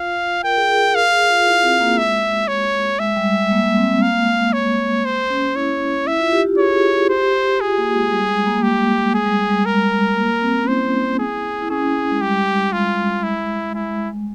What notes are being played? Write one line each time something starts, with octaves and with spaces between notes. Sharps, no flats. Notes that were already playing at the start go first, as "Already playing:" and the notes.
Already playing: F4 F5
A#4 G5
G#4
G#4
A#4
F5
G#4
F4
E4
C4
A#3
G#3 E5
C#5
G#3 E5
G3
G#3
A#3
C4
A#3 F5
G#3
A#3
G#3
C#5
C5
C#4
E4 C#5
E4 E5
F4
G4
G4
G#4 C#5
G#4
G4 C5
F4 G#4
A#3
G#3
G3
G#3
A#3
A#3
G#3 G4
G#3 G#4
G3
G3
G#3 A#4
A#3
C4
C#4
E4 C5
G#4
E4
C#4 G#4
G#3
G3 G4
G#3 F4
E4
G#3 E4